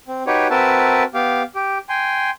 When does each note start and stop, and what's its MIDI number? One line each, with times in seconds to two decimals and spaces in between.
0.08 0.23 60
0.27 0.48 63
0.27 0.48 66
0.27 0.48 67
0.27 0.48 71
0.27 0.48 73
0.50 1.04 60
0.50 1.04 66
0.50 1.04 70
0.50 1.04 71
0.50 1.04 76
0.50 1.04 81
1.14 1.43 59
1.14 1.43 67
1.14 1.43 77
1.55 1.78 67
1.89 2.30 79
1.89 2.30 80
1.89 2.30 84